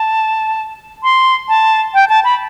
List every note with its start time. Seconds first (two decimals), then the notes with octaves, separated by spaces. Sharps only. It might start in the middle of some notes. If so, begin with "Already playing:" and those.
Already playing: A5
1.03 C6
1.49 A5
1.94 G5
2.09 A5
2.24 B5